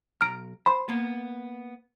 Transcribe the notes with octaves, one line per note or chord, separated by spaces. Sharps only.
B1 A#5 F6 D7
C5 B5 C6
A#3 B3